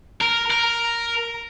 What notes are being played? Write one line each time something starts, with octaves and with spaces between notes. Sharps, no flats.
A#4
A#4